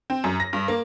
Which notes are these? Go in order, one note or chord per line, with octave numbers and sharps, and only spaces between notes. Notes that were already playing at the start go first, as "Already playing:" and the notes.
C4
F#2
A#6
G2
A#3